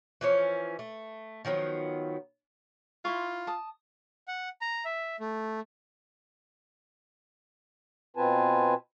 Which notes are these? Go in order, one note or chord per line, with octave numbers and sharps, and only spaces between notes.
E3 F3 C#4
A3
D#3 F3 F#3 B3
E4 F4 C6 C#6
A5 D#6
F#5
A#5
E5
A3
B2 C4 F4 B4 G#5 A5